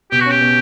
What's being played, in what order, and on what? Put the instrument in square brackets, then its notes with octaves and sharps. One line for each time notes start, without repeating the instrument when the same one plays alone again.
[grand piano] B2 [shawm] G4
[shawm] F#4
[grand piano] C#4 [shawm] G4
[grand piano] B2